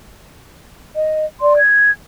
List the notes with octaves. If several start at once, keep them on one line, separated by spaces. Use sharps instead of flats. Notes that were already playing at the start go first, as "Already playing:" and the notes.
D#5
D5 C6
G#6